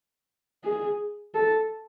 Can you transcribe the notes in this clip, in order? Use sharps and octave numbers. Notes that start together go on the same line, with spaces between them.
G#4
A4